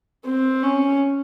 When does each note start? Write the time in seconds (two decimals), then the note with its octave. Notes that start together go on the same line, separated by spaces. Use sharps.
0.25 C4
0.63 C#4